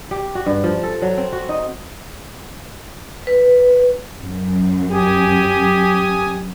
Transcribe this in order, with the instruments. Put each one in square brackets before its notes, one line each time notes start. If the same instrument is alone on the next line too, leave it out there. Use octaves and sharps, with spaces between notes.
[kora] G4
F#4
G2
F3
A4
F#3
C4
F#4
D#4
[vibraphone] B4
[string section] F#2
[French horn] G4 [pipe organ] G#5 D#6